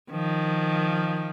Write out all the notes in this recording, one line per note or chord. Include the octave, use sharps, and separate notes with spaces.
D#3 F3